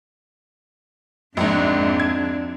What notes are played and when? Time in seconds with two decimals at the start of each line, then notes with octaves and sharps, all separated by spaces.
1.37 A#1 F2 G#2 D4
2.00 G#6